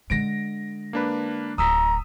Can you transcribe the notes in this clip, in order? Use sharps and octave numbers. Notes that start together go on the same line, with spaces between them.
D3 G#3 A#6 D7
A#3 D4 B4
D1 A#5 D#6 E6 B6